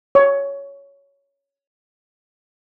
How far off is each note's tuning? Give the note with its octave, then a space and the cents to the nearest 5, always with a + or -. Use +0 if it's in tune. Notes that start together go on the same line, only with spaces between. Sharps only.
C#5 +10